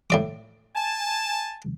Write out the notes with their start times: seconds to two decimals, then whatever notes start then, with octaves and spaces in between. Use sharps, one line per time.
0.10 A2 D5 D6
0.76 G#5 A5